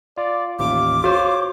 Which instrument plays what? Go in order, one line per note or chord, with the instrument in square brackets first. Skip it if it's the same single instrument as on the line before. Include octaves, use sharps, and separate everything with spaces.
[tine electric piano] F4 [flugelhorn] D5
[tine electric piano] A1 D#2 [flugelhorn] F4 [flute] D6
[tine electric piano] F4 C5 [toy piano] F#4 [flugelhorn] C#5